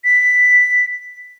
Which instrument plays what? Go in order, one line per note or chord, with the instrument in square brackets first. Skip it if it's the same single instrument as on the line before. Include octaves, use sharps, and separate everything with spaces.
[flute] B6